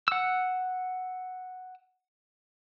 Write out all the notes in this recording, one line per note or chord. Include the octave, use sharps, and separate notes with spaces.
F#5 E6